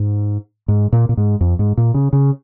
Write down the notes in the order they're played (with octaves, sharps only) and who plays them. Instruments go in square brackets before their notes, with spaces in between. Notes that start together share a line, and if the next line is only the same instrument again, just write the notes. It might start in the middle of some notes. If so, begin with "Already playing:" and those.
Already playing: [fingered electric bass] G#2
G#2
A#2
A#2
G#2
F2
G#2
A#2
C#3
C#3